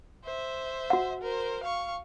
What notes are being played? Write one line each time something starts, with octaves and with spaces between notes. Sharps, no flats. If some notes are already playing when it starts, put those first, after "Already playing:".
C5 E5
F#4 F#5
A#4 C5
F5 C#6